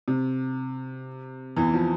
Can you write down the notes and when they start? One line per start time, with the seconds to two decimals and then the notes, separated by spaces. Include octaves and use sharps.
0.08 C3
1.56 E2 E3
1.74 F3